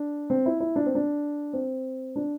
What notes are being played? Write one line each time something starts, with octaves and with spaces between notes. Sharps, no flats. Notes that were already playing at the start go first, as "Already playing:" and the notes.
Already playing: D4
C4
E4
E4
D4
C4
D4
C4
D4